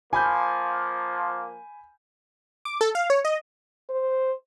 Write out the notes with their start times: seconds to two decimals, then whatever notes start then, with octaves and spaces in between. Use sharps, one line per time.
0.13 F3 A#3 G#5 B5 G6
2.65 D6
2.81 A4
2.95 F5
3.10 C#5
3.25 D#5
3.89 C5